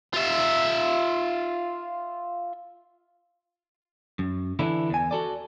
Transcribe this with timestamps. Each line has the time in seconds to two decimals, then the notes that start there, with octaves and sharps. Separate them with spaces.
0.13 F4 E5
4.19 F#2
4.59 D3 E3 D4 E4
4.90 E2 G#5
5.11 F#4 A4 D5